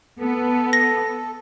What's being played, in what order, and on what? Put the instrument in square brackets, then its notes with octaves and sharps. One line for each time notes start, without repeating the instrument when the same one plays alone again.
[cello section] B3 [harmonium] A4
[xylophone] A#6